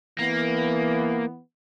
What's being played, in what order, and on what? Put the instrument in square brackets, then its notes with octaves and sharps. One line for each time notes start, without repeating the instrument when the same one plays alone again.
[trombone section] E3 B3 [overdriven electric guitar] A#3